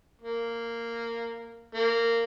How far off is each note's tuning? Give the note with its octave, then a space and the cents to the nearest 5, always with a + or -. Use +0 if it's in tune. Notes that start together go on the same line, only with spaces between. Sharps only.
A#3 -10
A#3 -15